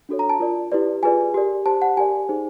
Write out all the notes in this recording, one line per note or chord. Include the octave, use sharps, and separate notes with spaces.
D4 F#4 A4 C#5
A#5
A5
F4 A#4 D5
E4 G4 B4 D5
F4 G#4 B4 D5 G#5
G4 A#4 D5
G4 C5 A5
F#5
G4 A#4 D5 G#5
D#4 G#4 C5